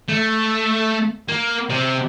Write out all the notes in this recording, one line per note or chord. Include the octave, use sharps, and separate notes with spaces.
A3
A#3
C3